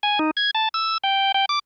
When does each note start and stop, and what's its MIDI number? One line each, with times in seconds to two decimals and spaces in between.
0.03 0.19 80
0.19 0.31 63
0.37 0.51 92
0.55 0.69 81
0.74 0.98 88
1.04 1.32 79
1.34 1.45 79
1.49 1.59 86